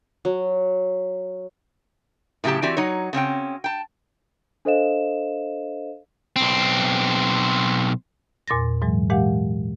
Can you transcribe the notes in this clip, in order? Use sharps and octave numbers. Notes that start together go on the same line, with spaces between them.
F#3
A2 C#3 F#3 G4 A5
E3 C4 F#4 G4 D5
F#3 D#4 C#5
C#3 C4 C#4 G5
G5 A5
D4 A4 C5 D#5 F5 E7
B1 C4
E2 A#2 C6 A6 A#6
G#2 E3 F#3 G#3
A#2 E3 G#3 G4 F5 F#5